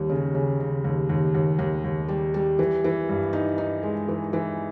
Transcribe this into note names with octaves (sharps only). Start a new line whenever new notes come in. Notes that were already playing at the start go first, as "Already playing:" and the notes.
Already playing: D#2 G3
C#3
C#3
C#3
D#2
D#2
D#2
D#2
D#2
G3
G3
E3
E3
G2
D#4
D#4
G#3
E3
E3